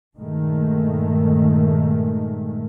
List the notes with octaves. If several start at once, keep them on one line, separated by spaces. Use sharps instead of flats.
G2 A#2 D#3 G#3 A3